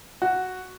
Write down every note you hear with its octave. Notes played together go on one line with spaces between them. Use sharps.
F#4